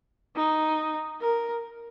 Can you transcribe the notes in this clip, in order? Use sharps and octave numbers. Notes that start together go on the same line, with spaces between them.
D#4
A#4